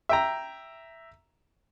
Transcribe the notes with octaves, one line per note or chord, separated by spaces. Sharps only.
E5 G5 A#5